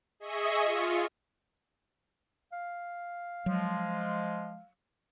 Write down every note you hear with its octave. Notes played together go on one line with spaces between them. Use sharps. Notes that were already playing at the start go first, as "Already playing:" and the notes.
G#4 D#5 E5 C#6
F4 C#7
F5
F3 F#3 G#3